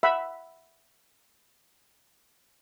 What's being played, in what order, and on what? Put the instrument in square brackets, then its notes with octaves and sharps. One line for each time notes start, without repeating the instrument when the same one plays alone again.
[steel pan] E5 F#5 B5